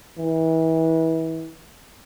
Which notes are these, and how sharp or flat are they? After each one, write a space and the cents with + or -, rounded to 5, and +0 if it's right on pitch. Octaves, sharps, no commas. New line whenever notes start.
E3 -30